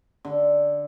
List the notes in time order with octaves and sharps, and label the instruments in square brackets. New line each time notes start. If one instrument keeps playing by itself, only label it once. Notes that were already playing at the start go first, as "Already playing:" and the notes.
[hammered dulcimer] D3